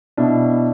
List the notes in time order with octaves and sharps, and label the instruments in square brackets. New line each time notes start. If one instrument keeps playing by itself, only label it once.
[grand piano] B2 [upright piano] D4 E4